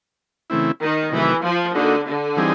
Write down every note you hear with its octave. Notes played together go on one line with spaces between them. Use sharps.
C#3 E3 A3 C4 E4
D#3
C3 D#3 E3 F#3 A3
F3
D3 A#3 D#4 F#4
D3
E3 G3 C4 D#4 G#4